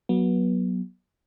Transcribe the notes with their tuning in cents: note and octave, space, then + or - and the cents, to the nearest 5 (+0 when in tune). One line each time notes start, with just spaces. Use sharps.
F#3 +0 B3 -30